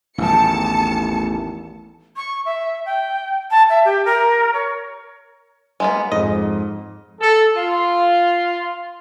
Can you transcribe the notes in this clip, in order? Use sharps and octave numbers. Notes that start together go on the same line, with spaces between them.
A1 E2 D#3 A5 C#7
C#6
E5
G5
A5
E5
G4
A#4
C#5
G#3 A#3 B3
F2 G#2 D#5
A4
F4